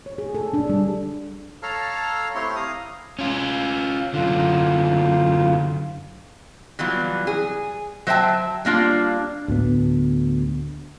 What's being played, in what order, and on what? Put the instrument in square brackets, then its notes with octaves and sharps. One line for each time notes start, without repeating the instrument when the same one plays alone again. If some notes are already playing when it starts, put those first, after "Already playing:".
[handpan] C#5
G#4
A4
D4
G3
[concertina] A4 C#5 F5 A5 A#5 F6
A3 C4 E4 G4 C#5 C6
F5 A#5 D#6
[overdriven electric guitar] C#4 F4
[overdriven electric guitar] F#2 D3 [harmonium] F4
[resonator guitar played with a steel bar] E3 F#3 G3 B3 F4
G#4
F#3 C5 E5 G5 A5
G3 A#3 D4 F4
[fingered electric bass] D2 A2 B3